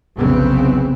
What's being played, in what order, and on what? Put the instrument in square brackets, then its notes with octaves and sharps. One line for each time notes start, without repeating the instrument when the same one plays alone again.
[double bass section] F1 B1 C#3 B3 C4